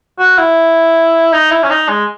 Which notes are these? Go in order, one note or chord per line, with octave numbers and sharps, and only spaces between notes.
F#4
E4
D#4
E4
C#4
D#4
G#3